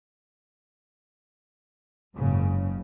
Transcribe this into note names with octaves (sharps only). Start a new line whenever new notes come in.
F#1 G#2 C#3